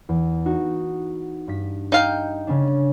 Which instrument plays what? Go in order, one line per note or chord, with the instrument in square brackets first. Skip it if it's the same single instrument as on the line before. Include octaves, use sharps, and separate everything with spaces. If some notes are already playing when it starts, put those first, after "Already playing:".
[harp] E2
D#4 F#4
G2 B6
[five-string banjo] D#4 F5 G5
[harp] C#3 C#4 D4